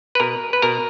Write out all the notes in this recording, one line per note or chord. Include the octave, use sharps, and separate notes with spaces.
B4
B2 A#4
B4
B2 A#4